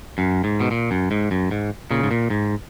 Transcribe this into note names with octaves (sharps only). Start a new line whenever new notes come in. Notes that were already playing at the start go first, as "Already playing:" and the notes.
F#2
G#2
B2
A#2
F#2
G#2
F#2
G#2
A#2 C#3
G#2
A#2
G#2